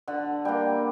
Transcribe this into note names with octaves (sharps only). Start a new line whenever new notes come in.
D3 F#5
G3 A#3 G5